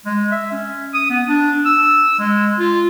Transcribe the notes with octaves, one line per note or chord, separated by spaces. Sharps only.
G#3
E5
C#4
D#6
B3
D4
E6
G#3
F4